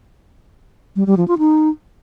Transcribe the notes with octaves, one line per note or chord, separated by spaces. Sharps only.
G3
G3
F3
F4
D#4